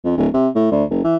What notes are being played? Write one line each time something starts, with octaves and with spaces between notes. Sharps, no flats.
F2
D1
C3
A2
D2
F#1
E3